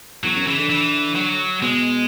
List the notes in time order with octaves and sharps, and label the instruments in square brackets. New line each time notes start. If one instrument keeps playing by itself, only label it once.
[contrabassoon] E2 [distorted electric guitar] F#3
[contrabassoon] F#2
[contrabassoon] C#3 [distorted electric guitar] E3
[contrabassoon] D3
[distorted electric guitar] E3
F#3
[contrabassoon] B2 [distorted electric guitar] G#3